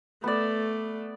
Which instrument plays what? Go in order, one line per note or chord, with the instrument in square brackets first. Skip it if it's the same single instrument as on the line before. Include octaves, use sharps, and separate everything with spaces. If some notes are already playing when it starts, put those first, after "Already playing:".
[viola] A3 [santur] B3 D5